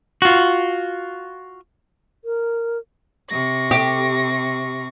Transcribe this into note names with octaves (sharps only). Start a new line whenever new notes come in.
F4 F#4
A#4
C3 C#6 A#6
G4